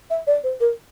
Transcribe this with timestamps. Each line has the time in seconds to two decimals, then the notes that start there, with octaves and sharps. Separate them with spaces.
0.10 E5
0.27 D5
0.44 C5
0.61 A#4